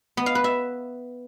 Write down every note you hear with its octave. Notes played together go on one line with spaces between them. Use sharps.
B3
F5
B4
E5